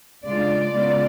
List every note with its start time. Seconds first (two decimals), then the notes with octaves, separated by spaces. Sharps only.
0.24 C#3 G#3 D4 F4 D5
0.72 C#3 G#3 B3 F4